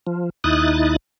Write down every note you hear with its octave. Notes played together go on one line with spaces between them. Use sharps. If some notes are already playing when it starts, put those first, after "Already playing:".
F3
D#2 D#4 E4 D#6 F#6 A6